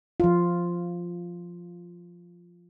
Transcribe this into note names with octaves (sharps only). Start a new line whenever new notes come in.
F3 F4